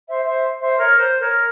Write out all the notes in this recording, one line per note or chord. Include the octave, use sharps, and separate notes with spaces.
C5 E5
C5 E5
C5 E5
A#4 C#5
C5
A#4 C#5